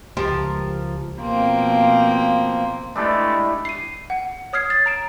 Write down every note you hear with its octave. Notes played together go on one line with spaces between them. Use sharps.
C#2 F3 G#3 G4 A#4
B2 F3 A#3 C4
G#3 A3 D4 E4 G4
C7 D#7
F#5
C#5 D#6 F6 G#6 C7
A6
A#5 D7 E7